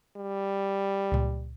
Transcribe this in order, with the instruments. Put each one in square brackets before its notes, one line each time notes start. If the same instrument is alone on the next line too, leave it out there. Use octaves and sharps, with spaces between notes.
[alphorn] G3
[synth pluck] C#2 A#2